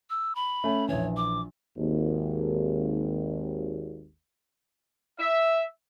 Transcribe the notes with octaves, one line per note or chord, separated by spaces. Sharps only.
E6
B5
A3 C#4
A#1 E3 C#5
D6
G#1 D#2
E5